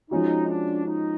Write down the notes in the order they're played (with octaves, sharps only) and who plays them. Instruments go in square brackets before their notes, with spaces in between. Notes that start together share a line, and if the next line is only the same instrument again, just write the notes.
[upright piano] F3 G#3 C#4 F#4 [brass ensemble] D#4
[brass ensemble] D4
D#4